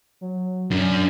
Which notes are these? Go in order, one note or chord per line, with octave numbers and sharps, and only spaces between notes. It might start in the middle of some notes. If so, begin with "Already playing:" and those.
F#3
F#2 D4